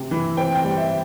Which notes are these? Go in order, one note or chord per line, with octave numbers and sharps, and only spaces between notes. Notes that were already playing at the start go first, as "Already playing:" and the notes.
Already playing: C3
E3
C4 G5
G5
G3
E5